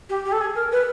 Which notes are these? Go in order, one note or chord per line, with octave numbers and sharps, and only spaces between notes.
G4
G4
A4
G#4
A#4
B4